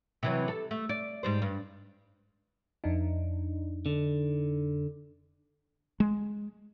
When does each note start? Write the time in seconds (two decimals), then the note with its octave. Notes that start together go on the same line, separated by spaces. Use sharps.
0.23 C3 E3 F#3
0.48 A4
0.71 A3
0.89 D5
1.23 G#2 G3 C5
1.42 G2
2.84 F2 D4 D#4
3.86 D3
6.00 G#3